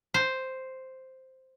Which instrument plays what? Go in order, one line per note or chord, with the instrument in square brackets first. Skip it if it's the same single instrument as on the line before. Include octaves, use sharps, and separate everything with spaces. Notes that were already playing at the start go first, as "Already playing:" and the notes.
[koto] C5